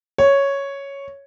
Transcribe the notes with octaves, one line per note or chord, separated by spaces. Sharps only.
C#5